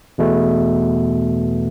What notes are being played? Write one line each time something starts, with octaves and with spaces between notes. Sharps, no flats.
E2 B2 A3